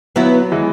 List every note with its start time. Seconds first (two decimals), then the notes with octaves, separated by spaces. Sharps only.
0.16 F#3 B3 E4
0.52 E3 G#3